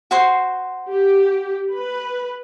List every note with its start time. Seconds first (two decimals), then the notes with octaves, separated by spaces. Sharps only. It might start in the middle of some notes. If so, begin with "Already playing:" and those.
0.11 F#4 C5 C6
0.90 G4
1.74 B4